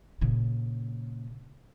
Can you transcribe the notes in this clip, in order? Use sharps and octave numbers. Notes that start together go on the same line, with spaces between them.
A#2 C#3